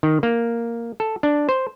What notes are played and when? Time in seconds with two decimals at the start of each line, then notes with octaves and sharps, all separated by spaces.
0.03 D#3
0.23 A#3
1.00 A4
1.23 D4
1.49 C5